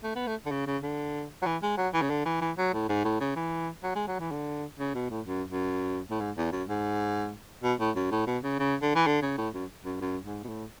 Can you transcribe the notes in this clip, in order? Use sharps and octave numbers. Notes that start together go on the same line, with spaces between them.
A3
B3
A3
D3
C#3
C#3
D3
F#3
E3
G#3
F#3
E3
C#3
D3
E3
E3
F#3
A2
G#2
A2
C#3
E3
F#3
G#3
F#3
E3
D3
C#3
B2
A2
F#2
F#2
A2
G#2
E2
F#2
G#2
B2
A2
F#2
A2
B2
C#3
C#3
D3
E3
D3
C#3
A2
F#2
F#2
F#2
G#2
B2
A2